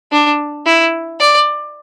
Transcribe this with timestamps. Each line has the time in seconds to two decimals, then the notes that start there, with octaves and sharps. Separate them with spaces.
0.12 D4
0.66 E4
1.20 D5